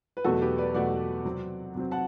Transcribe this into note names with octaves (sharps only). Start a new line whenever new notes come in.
B4
E2 B2 F#3 A3 F#4 A4
G4 B4
B4 D5
E2 B2 F#3 A3 D5 F#5
C3 F#3 C4
C3 F#3 C4
F#5 A5